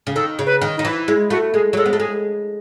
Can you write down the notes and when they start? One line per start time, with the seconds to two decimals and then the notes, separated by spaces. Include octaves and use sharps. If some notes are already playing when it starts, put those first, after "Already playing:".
0.07 C#3
0.15 D#3 A4
0.39 C#3
0.46 B4
0.62 D#3
0.77 D#3 D#4
0.85 E3
1.08 G#3 E4
1.30 A3 F#4
1.54 G#3 G#4
1.73 F#3
1.77 G#3 A4
1.86 B3
1.93 A3
2.00 G#3 G#4